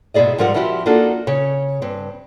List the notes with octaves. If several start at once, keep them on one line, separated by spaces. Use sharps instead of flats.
G#2 B2 E4 G#4 D5 D#5
G#2 F3 G3 A#4 F#5
F3 C4 E4 F#4 G4
A#3 D4 D#4 F4 F#4 A4
C#3 C#5
G2 C4